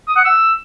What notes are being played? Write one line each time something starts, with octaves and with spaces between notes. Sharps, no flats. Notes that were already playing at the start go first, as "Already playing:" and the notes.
D#6
F#5
E6